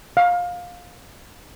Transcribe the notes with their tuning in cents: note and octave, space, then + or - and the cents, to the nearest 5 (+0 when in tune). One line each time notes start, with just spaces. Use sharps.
F5 +20